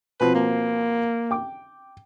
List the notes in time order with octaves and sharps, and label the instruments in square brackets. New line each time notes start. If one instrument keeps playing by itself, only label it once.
[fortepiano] B2 F3 C4 [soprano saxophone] B4
[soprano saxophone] A#3
[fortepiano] G5 D6